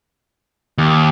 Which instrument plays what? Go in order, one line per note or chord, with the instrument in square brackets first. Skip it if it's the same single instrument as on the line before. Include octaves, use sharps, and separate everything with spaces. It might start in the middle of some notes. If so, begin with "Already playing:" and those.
[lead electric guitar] D#2